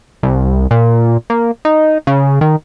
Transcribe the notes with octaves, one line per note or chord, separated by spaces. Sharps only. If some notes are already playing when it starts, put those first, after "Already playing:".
C2
A#2
A#3
D#4
C#3
D#3